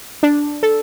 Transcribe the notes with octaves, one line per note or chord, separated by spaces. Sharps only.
D4
A4